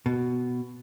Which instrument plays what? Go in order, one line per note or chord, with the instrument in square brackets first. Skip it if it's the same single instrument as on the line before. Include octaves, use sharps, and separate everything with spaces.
[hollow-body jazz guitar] B2